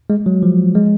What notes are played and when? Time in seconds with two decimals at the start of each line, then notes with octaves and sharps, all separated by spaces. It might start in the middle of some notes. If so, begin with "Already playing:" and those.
0.10 G#3
0.26 F#3
0.43 F3
0.75 G#3